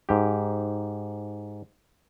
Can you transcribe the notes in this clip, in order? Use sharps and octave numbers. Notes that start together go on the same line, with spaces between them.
G#2 G4